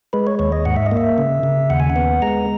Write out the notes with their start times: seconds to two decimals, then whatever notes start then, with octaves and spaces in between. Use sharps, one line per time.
0.13 G#3 B4
0.27 C#5
0.39 D#2 C#5
0.52 D#5
0.65 G#2 F#5
0.76 E5
0.86 D#5
0.91 A#3
0.97 E5
1.18 C#3
1.43 C#3
1.70 D#2 F#5
1.80 G#5
1.90 F#5
1.96 B3
2.22 G#3 A#5